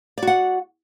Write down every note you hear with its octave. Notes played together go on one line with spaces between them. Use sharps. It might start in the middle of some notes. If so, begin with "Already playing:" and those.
F#4 D5 F#5